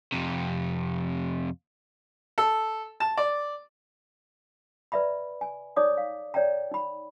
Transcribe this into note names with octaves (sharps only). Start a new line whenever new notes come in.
F2 C3
A4
A5
D5
B4 D5 E5 A#5 B5
G#5
D#4 C#5 D5 A#5 D6 D#6
F5
C#5 D5 E5 G5 A#5
D#4 B5